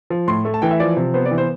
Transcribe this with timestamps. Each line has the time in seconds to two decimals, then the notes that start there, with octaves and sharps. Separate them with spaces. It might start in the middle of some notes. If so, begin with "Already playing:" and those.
0.10 F3
0.28 A2 C6
0.45 A3
0.54 A5
0.62 E3 G5
0.71 E5
0.80 F3 D5
0.97 C3
1.14 B3 C5
1.26 D5
1.31 E3
1.38 C5